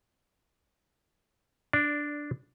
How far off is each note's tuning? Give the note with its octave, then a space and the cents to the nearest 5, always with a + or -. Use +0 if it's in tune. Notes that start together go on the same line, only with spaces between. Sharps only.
D4 +0 D5 -15